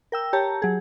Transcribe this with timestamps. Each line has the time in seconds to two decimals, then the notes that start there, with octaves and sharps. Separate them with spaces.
0.12 A#4 G5 E6
0.33 G4 C#5 A5 A#5
0.62 F#3 G#4